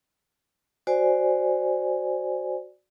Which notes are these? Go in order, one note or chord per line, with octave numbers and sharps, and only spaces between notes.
F#4 C5 D5 G#5